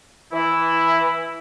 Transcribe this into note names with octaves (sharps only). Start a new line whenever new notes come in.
E3 E4